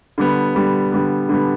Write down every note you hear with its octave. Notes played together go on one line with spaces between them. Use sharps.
D3 G3 B3
D3 G3 B3
D3 G3 B3
D3 G3 B3